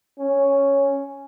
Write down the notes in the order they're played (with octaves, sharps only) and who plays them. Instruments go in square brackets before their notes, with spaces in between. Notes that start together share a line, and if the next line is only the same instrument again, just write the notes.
[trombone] C#4